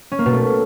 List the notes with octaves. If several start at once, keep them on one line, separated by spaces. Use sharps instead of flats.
C#4
A#3
B2
A3